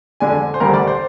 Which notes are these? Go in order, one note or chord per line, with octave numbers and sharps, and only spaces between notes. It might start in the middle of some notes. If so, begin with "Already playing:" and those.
F2 D3 G#3 D4 G#5
C5
D2 D3 G3 A#4
D5
C5